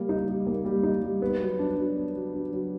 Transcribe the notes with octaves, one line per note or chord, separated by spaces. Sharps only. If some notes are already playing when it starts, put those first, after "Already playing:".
Already playing: G3 A#3
D#4
G3
A#3
G3
D#4
G3
B3
F#3
D4
F#3
B3
F#3
D4
F#3